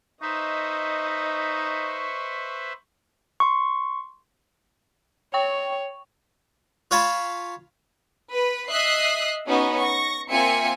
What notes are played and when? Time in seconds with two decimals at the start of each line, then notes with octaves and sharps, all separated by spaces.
0.22 D#4 B4 C5 D#5 E5 C#6
3.40 C6 C#6
5.34 C#5 G5 C#6
6.91 F4 C#5 F5 A5 B5
8.32 B4
8.69 D#5 E5 D#6 F#6 C7
9.48 B3 C#4 D#4 F#4
9.82 C#6 A#6
10.30 A#3 C4 F4 E5 G#5 C#7